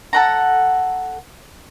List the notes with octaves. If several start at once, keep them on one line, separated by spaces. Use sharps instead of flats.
A4 F#5 A#5